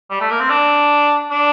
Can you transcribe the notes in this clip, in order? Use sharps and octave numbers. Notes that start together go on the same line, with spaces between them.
G3
A3
A#3
C4
D4
D4